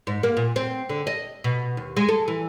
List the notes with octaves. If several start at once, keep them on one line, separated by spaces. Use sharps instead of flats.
G#2
A#3
A#2
C4
D3
D#5
B2
D#2
G#3
A4
E3